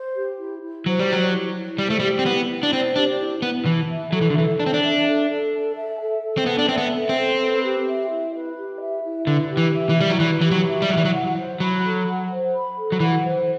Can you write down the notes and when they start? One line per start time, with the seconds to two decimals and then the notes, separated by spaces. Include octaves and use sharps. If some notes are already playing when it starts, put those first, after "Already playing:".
Already playing: C5
0.16 G4
0.39 E4
0.63 E4
0.86 F#3 C5
0.99 G3
1.09 F#3 G4
1.32 E4
1.55 E4
1.78 G3 C5
1.90 A3
2.00 G3
2.02 G4
2.19 C4
2.26 B3 E4
2.50 E4
2.63 D4
2.73 C4 C5
2.95 D4 G4
3.19 E4
3.42 B3 E4
3.66 E3 A5
3.89 E5
4.12 F#3 A4
4.21 E3
4.30 D3
4.36 E3 A4
4.59 D4 A5
4.66 C4
4.74 D4
4.83 E5
5.06 A4
5.29 A4
5.53 A5
5.76 E5
6.00 A4
6.23 A4
6.38 C4
6.46 B3 A5
6.59 D4
6.69 C4 E5
6.78 B3
6.93 A4
7.09 C4
7.16 A4
7.40 B4
7.63 G4
7.86 E5
8.09 E4
8.34 B4
8.56 G4
8.81 E5
9.03 E4
9.27 D3 B4
9.50 G4
9.57 E3
9.73 E5
9.89 E3
9.96 G3 E4
10.10 F#3
10.20 E3 B4
10.41 E3 G4
10.51 F#3
10.67 E5
10.82 G3
10.90 F#3 E4
10.97 E3
11.05 F#3
11.13 F#5
11.36 C5
11.60 F#3 B5
11.84 A4
12.07 F#5
12.31 C5
12.54 B5
12.77 A4
12.92 F#3
13.00 E3 F#5
13.24 C5